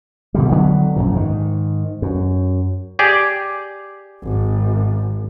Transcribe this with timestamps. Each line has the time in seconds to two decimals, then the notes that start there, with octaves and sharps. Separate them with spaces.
0.34 B2 D3 G3
0.51 D3 F#3 B3
0.96 A#1 F#2 A#2
1.12 G#2 D#3
2.02 F#2
2.99 G4 G#4 D5
4.23 G#1